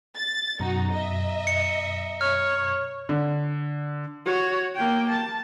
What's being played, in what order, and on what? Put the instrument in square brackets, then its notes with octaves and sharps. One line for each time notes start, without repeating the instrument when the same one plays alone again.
[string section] A6
[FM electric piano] F#2 B2 A#5 [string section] D#4 F#4
[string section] D#5 E5
[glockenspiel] C#7
[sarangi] C#5 [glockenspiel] F6
[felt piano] D3
[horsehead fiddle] F#4 C#5
A#3 G5
A5